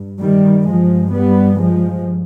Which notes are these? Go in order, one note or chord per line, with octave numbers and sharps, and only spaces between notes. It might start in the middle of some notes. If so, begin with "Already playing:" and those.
Already playing: G2
D#3 G3
G2 F3 G#3
G3 B3
F3 G#3